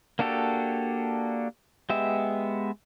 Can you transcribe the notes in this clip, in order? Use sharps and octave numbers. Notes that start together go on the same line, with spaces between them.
A#3 D4 F#4 G4 A4
G#3 B3 G4 E5